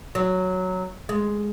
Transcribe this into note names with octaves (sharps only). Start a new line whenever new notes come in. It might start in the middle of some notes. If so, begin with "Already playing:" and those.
F#3
G#3